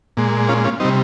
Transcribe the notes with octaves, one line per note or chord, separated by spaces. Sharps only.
A#2 G#3
C#4 F4
C#4 F4
C3 G3 C4 D#4